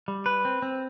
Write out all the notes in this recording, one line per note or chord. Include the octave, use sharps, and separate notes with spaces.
G3
B4
C4
C4